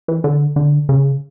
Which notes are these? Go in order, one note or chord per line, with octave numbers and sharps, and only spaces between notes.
E3
D3
D3
C#3